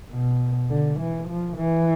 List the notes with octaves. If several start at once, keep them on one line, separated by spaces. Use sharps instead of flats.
B2
D3
E3
F3
E3